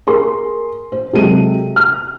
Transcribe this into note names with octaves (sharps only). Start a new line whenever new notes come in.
G#4 A#4 C6
C5
C3 F#3 G#3 A4 D#7
F6